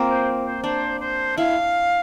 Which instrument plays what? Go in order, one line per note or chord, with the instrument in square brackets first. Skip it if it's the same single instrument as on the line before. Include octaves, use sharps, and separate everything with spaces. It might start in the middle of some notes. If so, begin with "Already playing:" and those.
Already playing: [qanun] A#3 C4 F4
[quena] C5
C5
[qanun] D4 [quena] C5
[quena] C5
[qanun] E4 [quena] F5